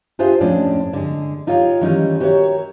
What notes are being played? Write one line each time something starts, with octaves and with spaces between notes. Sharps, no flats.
D4 F4 G4 G#4 C5 E5
F2 A2 G#3 C#4 D4
D3 G#3
D#4 F4 G4 C#5 D#5 F5
D#3 E3 G3 G#3 C#4 D#4
F#4 G4 A#4 B4 C#5 E5